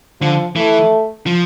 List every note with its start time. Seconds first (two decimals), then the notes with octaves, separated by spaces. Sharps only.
0.21 D3 F3
0.56 E3 A3
1.27 F3